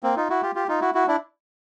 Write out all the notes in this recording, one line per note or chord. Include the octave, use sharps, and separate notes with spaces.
A#3 C4
D#4 F4
E4 F#4
F4 G4
F4 G4
D#4 F4
E4 F#4
E4 F#4
D4 E4